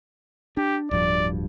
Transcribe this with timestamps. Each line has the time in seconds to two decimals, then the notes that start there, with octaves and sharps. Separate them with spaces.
0.57 D4 G4
0.91 D1 G2 F3 D5